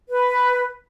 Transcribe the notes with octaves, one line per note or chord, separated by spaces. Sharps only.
B4